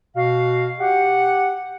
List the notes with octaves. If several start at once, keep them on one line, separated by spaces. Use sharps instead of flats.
B2 F#4 F5
G4 F#5